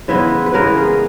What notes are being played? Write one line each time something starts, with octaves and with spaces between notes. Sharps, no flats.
C#3 E3 G#3 B3 E5
B4
C#3 E3 G#3 B3 A#4
G#4